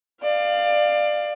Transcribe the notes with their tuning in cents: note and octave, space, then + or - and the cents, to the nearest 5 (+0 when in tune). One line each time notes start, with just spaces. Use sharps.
D5 +25 F5 +0